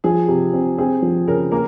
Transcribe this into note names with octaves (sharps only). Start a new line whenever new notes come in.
F3 G#4
C3
C4
C4 G#4
F3
C#3 A#4
A#3 A#4